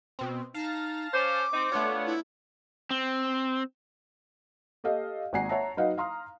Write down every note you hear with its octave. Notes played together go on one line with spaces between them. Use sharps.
B2 C4
D#4 F5 A5 A#6
C#4 C5 D6
C4 D#4
A3 B3 D4 F4 C#5
E4
C4
G4 A4 D#5 F5
G#1 D5 F#5 G#5 A#5 C7
C#5 E5 F#5 A5 A#5
F#3 D#4 B4 D#5 F5 F#5
F5 A#5 C6 D#6 F6